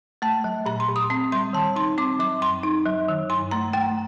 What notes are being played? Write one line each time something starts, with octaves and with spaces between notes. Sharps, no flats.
A3 A5
F#3
A#2 A#5
C6
A#2
D#6
C4
G3 C6
D#3 A5
D#4 C6
C4 D6
F#3 D6
F#2 C6
D#4
F#3
D#3
G2 C6
A3 A#5
A3 G5